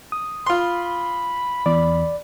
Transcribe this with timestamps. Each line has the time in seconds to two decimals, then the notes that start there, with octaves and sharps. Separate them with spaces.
0.12 D#6
0.46 F4 B5 C6
1.66 E2 D5